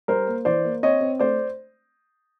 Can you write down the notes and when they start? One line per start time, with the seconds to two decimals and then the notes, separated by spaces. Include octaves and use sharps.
0.08 G3 A#4 C5
0.27 A#3
0.45 E3 C5 D5
0.65 A#3
0.83 C4 C#5 D#5
1.01 C4
1.20 A3 C5 D5